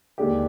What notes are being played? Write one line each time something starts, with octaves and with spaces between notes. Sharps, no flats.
D#2 D3 G#3 D4 G4